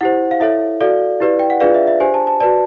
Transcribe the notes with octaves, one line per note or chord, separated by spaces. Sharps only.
E4 G4 C5 F#5
F5
E4 A4 C#5 E5
F#4 A4 D5 F5
E4 G4 B4 D5
G5
F#5
D4 F4 G#4 B4 D5 F5
E5
E5
D4 G4 C5 G#5
A5
A5
F#4 B4 D5 A5